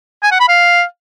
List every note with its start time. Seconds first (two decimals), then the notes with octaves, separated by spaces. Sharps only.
0.23 G#5
0.31 F#5
0.40 B5
0.49 F5